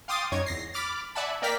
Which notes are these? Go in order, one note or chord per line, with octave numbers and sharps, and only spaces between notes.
F5 G5 C6 D6 D#6 A6
F#2 D#4 C#5 G#6
E2 A#6 C7
B5 D6 F6 A6
D5 E5 F#5 G#5 A5 B5
A#3 A#4 D5 G5 F6 B6